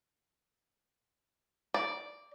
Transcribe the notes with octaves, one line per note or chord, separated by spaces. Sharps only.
D5